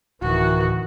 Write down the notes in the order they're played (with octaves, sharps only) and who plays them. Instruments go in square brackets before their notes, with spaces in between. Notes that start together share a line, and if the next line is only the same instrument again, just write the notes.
[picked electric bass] D1 [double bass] D#3 E3 [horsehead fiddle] F#4